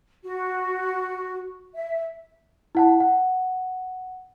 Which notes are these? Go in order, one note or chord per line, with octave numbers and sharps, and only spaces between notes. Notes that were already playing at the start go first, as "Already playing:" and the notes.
F#4
E5
E4 F#5 A5
F#5